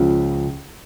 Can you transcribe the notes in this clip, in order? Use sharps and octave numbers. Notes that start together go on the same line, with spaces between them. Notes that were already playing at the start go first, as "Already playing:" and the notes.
Already playing: C#2 C#3 F3